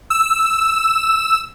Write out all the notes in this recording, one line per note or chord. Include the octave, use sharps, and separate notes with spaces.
E6